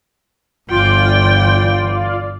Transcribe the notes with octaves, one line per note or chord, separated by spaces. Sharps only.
G1 E3 F4 D5 G5